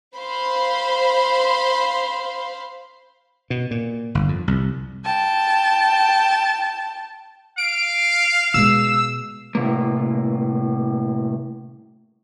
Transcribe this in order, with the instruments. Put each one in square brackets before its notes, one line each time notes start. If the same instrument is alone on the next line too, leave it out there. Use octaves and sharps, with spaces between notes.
[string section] C5 F5 B5 C6
[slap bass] B2
A#2
G1
F2
C2
[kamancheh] G5 A5
[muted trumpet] F5 [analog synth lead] D7
[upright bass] B2 G#3 [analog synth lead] E6
[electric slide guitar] A2 C3 A#3